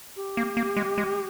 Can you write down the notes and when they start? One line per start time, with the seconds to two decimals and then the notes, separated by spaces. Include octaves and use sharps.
0.16 G4
0.37 A#3
0.57 A#3
0.77 G#3
0.98 G#3